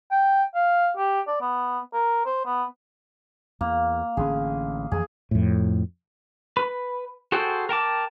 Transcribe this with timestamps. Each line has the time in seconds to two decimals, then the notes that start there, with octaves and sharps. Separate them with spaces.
0.11 G5
0.55 F5
0.97 G4
1.27 D5
1.41 B3
1.93 A#4
2.26 C5
2.46 B3
3.61 E2 A#3
4.17 A1 D3 C#4 G#4
4.92 F2 E3 G#4
5.31 F2 A2
6.57 B4
7.32 F#4 G#4 A4 C5 G5
7.69 A#4 G5 A5 D6